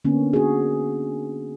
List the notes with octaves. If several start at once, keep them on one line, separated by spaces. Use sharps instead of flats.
D3 A#3 B3 C#4
F#4 G#4